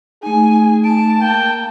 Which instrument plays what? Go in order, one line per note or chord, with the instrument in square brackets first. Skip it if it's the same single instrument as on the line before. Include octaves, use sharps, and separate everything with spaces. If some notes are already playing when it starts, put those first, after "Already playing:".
[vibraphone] A3 D#4 [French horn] G#4 [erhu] G#5
[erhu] A5 [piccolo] D7
[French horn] A#3 [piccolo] G5